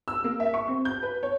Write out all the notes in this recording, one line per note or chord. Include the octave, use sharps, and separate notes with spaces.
E6
A#3
E5
C#6
C4
G6
B4
C#5